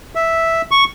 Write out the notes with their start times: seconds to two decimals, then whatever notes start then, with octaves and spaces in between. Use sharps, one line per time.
0.15 E5
0.71 C#6